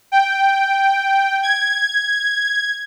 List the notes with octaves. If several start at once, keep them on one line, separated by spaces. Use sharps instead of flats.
G5
G#6